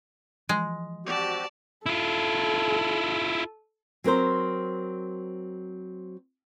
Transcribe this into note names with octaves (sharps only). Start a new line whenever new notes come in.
E3 F3 G#3
C4 F#4 G4 D5 A5
E4 F4 A4
F#3 C4 A#4 C5